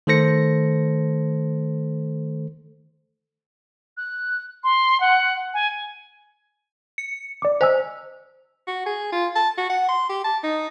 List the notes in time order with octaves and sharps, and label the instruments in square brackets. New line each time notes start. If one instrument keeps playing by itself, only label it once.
[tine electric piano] D#3 A3 A4 C5 A#6 C#7
[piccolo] F#6
C6
F#5
G#5
[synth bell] C#7
[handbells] D5 D6
[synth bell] C5 [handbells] D#5 G#5 E6
[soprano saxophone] F#4
G#4
F4
A5
F#4
F#5
C6
G4
A5
D#4